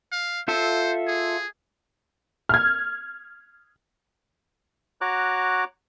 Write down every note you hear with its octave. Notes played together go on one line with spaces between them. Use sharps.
F5
F4 A4 C5 E5
G#4
F6 G#6
F#4 C#5 A#5 D6 F#6